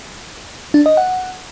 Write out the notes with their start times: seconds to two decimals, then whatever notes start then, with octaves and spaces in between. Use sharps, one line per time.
0.74 D4
0.86 D#5
0.97 F#5